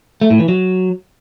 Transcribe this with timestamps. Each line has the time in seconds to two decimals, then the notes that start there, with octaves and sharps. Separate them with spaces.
0.21 A3
0.30 A2
0.39 E3
0.48 F#3